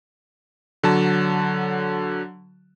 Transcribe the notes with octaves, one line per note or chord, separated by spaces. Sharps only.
D3 F#3 A5